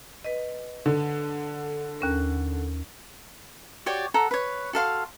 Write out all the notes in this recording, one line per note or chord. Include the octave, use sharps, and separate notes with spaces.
B4 D#5
D3
D#2 C#4 A#4
F#4 G4 C#5 D5
A4 F#5 A#5
B4 C#5
F#4 A4 F5 C6